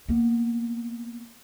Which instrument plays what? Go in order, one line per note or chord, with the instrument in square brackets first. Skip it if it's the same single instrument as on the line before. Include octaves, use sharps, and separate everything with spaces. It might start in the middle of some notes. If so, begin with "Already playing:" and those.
[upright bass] A#3 B3